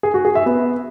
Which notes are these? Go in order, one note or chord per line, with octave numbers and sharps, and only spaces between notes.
G#4
F#4
G#4
E5
B3